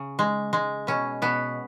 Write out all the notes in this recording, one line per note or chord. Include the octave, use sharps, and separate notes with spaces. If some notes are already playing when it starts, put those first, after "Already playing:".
Already playing: C#3
G#3
G#3
B2 C#4
B2 B3